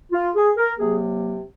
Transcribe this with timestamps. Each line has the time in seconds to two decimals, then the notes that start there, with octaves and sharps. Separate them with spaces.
0.12 F4
0.35 G#4
0.57 A#4
0.79 C3 F#3 A#3 G#4